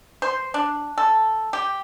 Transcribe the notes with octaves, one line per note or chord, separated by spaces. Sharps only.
C5
D4
A4
G4